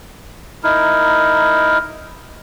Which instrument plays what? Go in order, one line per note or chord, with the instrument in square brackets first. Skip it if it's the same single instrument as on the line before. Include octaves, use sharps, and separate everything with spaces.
[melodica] D#4 E4 A#4